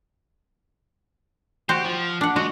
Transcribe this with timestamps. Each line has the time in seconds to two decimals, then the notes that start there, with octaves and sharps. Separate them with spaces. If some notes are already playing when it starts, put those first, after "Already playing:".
1.69 F#4 G4 C5
1.85 F3
2.21 D4 F#5
2.36 G#3 F#4 D#5